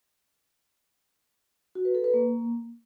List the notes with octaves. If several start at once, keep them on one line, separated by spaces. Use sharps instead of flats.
F#4
B4
A4
B4
A#3